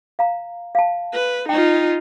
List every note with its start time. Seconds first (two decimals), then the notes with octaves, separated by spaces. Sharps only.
0.19 F5 A#5
0.75 F5 A5
1.13 B4
1.49 D#4 F4 G5